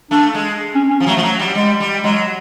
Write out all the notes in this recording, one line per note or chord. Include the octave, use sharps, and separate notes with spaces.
A3 D4
G#3
C#4
C#4
F3
F#3 A3
F3
F#3
G3
G3 G#3
G3
F#3 G#3